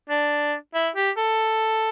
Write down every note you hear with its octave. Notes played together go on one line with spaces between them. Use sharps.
D4
E4
G4
A4